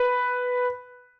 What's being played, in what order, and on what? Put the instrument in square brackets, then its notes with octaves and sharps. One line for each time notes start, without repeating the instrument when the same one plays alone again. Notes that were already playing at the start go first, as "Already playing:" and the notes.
Already playing: [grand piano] B4